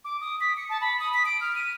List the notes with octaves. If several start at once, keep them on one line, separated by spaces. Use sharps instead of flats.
D6
D#6
B6
C#7
A5
B5
D#6
B6
D7
F6
D#7